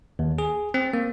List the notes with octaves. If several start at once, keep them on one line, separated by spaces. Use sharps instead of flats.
D#2
G#4
C4
A#3